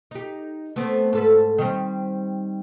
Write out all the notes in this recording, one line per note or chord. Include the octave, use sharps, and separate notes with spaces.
D#4 G4
A3 B3 C4
G#2 A4 B4
D#3 G3 C4